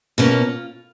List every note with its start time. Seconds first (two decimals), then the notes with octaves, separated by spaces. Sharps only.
0.18 B2 A#3 C#4 F4